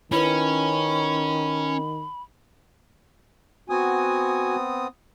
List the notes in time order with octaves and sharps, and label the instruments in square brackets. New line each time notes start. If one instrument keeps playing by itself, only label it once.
[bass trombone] D#3 [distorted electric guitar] C#4 [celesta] E4 B4 [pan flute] B5
[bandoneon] B3 C4 D#6 [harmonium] F#4 G#5